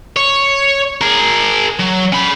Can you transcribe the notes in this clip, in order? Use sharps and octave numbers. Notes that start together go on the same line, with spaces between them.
C#5
G#4 A#4
F#3
C#4 B5